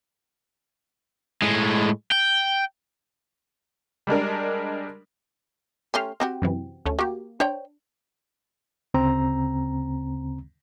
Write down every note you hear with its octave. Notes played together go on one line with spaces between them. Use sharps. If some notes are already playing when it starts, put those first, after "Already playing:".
A2 G#3
G5
G3 G#3 D4 A#4
A3 C#4 G4 C6 F6
C4 F#4 G4
F#2 C3 E3
D2 A3 C#4
A#3 F#4 G4
D4 C5 C#5 G5
D2 C#3 C4 A#5